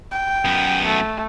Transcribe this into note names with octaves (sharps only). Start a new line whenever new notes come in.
G5
F#2 B3
A3